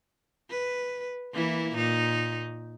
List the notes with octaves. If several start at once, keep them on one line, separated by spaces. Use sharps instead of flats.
B4
E3 A#3 E4
A#2 D#4